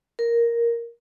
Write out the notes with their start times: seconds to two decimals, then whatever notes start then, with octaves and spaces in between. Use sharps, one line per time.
0.19 A#4